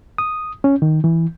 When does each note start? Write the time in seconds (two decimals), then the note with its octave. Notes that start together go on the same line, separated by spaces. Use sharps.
0.18 D#6
0.64 C#4
0.82 D#3
1.04 E3